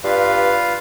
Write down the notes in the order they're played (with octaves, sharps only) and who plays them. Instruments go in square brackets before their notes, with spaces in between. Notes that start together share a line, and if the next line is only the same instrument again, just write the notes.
[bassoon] G2 [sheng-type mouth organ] F4 B4 F5